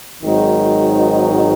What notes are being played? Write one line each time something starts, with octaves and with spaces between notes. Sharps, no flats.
G#1 G#2 D#3 F#3 D#4